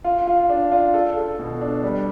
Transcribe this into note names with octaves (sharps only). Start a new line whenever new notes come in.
F4
F4
D4
F4
A4
A4
B2
D4
G3